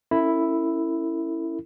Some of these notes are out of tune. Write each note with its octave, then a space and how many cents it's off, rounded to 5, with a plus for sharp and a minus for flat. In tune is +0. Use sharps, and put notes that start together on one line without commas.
C#4 +0 E4 +0 A4 +45